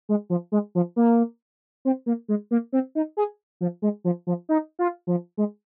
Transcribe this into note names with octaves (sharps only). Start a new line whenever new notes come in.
G#3
F3
G#3
F3
A#3
C4
A#3
G#3
A#3
C4
D#4
G#4
F3
G#3
F3
F3
D#4
F4
F3
G#3